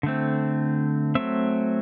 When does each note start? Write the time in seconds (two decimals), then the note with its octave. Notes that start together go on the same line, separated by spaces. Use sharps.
0.03 D3 A3 C4
1.15 F#3 A3 C4 E5